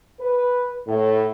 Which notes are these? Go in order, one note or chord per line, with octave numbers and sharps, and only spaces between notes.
B4
A2